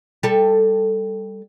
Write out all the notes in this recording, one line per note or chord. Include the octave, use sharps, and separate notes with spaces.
G3 A4